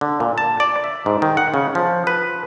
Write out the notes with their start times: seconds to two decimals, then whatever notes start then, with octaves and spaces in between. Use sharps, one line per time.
0.01 D3
0.20 A#2
0.38 A5
0.60 D5
0.84 E5
1.06 G#2
1.22 D#3
1.37 F#5
1.54 C#3
1.75 F3
2.07 B4